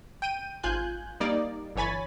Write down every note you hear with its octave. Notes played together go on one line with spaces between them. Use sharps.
G5 D#7
G#1 F4 G#5 F#6 G6
G3 A#3 D#4 D5
G1 E3 C#5 G#5 B5 A6